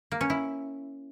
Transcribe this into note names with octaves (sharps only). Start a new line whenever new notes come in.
A#3
C#4
E4